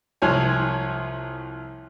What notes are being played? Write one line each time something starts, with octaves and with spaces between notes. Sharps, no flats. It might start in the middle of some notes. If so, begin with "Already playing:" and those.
C2 F3 C#5 G#5